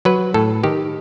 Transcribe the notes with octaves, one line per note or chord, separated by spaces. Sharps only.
F#3 B4
A2 A4
D#3 G4